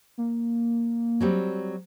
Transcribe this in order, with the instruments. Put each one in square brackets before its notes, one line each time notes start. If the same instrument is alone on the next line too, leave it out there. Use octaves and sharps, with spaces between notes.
[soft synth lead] A#3
[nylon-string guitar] F#3 G3 C4